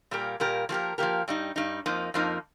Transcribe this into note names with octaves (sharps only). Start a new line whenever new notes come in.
A#2 G3 A#3 G4 A#4
A#2 G3 A#3 G4 A#4
F3 A#3 G4 A#4
F3 A#3 G4 A#4
G2 G3 D#4
G2 G3 D#4
F2 F3 A#3 D#4
F2 F3 A#3 D#4